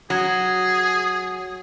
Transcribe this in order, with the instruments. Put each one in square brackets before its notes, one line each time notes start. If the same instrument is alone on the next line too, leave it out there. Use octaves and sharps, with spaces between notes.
[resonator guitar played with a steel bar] F#3 [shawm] G#4